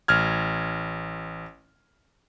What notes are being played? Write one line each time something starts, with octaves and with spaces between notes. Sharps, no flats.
A1 F6 G#6